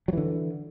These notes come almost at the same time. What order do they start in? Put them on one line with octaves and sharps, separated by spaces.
F#3 E3 D3